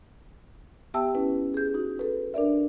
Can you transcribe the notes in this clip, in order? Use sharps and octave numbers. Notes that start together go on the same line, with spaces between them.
B3 G4 E5 G5 A5 E6
C#4 E4 B4
G#4 G6
D#4 F#4
A4 B4
D4 A#4 D5 E5